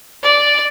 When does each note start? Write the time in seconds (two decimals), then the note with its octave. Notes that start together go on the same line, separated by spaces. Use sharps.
0.24 D5